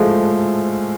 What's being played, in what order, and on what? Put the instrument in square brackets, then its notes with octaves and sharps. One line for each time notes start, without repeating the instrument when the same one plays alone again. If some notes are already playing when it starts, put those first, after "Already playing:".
Already playing: [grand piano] A2 F3 G#3 A3